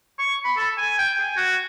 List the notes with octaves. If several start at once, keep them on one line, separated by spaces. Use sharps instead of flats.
C#6
B5
A4
G#5
G5
G#5
F#4